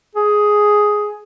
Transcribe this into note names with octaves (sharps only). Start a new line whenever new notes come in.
G#4